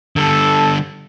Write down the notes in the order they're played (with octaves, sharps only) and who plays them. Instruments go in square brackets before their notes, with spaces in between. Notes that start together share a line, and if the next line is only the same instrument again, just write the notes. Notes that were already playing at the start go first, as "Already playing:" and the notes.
[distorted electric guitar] D3 G3 [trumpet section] A4